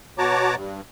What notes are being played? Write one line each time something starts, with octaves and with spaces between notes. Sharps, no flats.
B2 F#4 C#5 A5 A#5 D6
G2